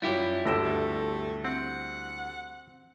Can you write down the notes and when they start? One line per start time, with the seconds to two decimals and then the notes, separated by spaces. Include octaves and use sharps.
0.02 F#2 G3 E4 F4 G4 F#5
0.45 G1 D2 D3 G5 A#6 E7
0.63 A3
1.45 C4 F#5